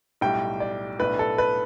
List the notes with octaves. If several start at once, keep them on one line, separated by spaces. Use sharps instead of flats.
B1 A2 G3 G5
D5
B1 A2 A3 D4 B4
A4
B4